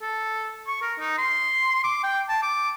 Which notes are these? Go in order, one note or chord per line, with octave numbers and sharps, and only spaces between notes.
A4
C#6
A#4
D#4
C6
D6
G5
A5
D6